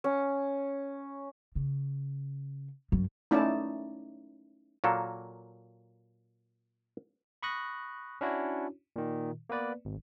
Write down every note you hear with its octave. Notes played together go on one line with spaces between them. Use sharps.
C#4
C#3
F#2
A3 C#4 D#4 E4 D5 A5
A#2 F#3 A#3 A4
B5 C#6 D#6 F#6 A#6
C#4 D4 E4 F#4 C#5
A#2 D#3
A#3 B3 B4 D5
G#1